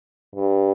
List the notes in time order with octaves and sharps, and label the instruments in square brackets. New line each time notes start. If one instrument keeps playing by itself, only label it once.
[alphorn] G2